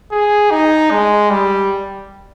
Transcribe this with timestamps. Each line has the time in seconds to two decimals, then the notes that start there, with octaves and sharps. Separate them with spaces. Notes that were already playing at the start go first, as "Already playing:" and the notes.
0.12 G#4
0.51 D#4
0.91 G#3
1.30 G3